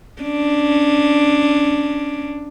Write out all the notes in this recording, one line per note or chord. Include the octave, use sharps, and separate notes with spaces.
C#4 D4